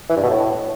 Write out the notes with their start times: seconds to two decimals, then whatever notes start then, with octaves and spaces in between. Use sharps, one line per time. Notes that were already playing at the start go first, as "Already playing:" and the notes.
0.09 E3
0.16 G2
0.23 B2
0.30 A2